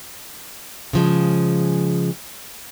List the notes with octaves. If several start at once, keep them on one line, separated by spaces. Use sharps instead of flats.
C#3 F3 G#3